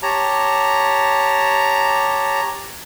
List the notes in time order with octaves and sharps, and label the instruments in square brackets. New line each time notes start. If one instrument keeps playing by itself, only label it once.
[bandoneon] G4 C#5 A5 A#5